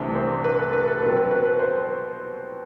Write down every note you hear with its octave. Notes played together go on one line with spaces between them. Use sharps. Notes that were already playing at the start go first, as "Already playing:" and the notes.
Already playing: C2 C3 E3 A3 D4 C5
C5
B4
A4
B4
A4
B2 F#3 C4 B4
B4
B4
B4
C5